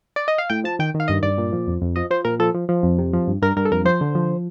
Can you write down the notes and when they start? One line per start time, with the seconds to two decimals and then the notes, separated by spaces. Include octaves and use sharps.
0.16 D5
0.28 D#5
0.38 F5
0.50 A2 G5
0.64 F3 A5
0.79 D#3 G5
0.94 D#3
1.00 F5
1.08 G2 D#5
1.23 G2 D5
1.38 A#2
1.53 F3
1.67 F2
1.82 F2
1.96 F3 D#5
2.10 F3 C5
2.25 A#2 A#4
2.40 F3 A4
2.54 F3
2.69 F3
2.83 F2
2.98 C3
3.13 F3
3.28 G2
3.42 G2 A#4
3.56 G2 A#4
3.65 A4
3.71 F2 A#4
3.85 F3 C5
4.01 D3
4.15 F3